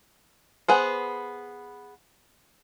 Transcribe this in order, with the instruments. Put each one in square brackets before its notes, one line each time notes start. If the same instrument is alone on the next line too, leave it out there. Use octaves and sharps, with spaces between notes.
[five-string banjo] B3 G#4 C5